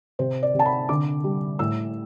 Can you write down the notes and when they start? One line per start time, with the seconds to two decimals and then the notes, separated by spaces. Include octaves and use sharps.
0.19 C3 C5
0.43 D5
0.54 C3
0.59 A5
0.65 B5
0.89 D3 D6
1.24 G3
1.59 A2 E6